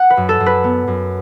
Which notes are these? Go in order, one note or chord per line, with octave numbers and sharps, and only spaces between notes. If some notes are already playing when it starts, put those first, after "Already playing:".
Already playing: F#5
B4
F#2
A4
F#2
B4
B3
F#2